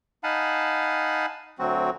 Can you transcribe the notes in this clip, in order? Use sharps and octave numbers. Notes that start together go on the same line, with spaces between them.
D#4 F5 F#5 G#5 A5 B5
D2 F#3 C4 F#4